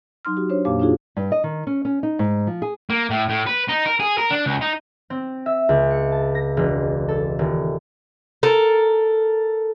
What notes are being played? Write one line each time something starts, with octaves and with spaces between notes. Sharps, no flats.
F#3 D#4 C6 F6
F#4 G4
D4 C5 C#5
F2 A#2 A#3 G4 F5 D6
D4 D#4 F4 F#4 G#4
G2
D#5
D#3
C#4
C#4
D#4
G#2
F3
G#4
A#3
A2
A2
B4
D#4
A#4
G#4
A#4
D4
C#2
D#4
C4
E5
C#2
C#7
A5
A#6
E1
A4
D#1
A4 A#4